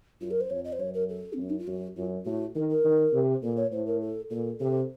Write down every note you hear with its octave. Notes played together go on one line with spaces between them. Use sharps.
F#2 F4
A#4
C5
F2 C#5
D#5
C5
F#2 C#5
A#4
A4
C4
F#2 C#4
D#4
F4
F#2 F#4
F#2 F4
A2 F#4
D#3 A#4
A#4
D#3
C3
A#2 A4
C#5
A2 C5
A#4
A4
A#2 A4
C3 A4